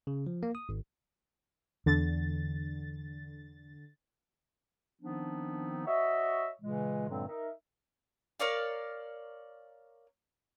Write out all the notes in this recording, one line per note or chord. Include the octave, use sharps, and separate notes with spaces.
C#3
F3
A#3
D#6
G#1
E2 D3 A6
D#3 F3 B3 C4 D4 D#4
F#4 C#5 D#5 E5
A#2 C#3 E3 G#3
G2 A#2 D3 F#3 G#3 C4
D#4 A#4 E5
A#4 C#5 D5 F5